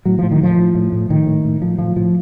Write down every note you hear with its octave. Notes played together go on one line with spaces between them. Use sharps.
A2 F#3
A2 F3
D#3
A2 F3
A2
A2
A2
A2 D#3
A2
A2
A2 F3
A2 F3
A2 F3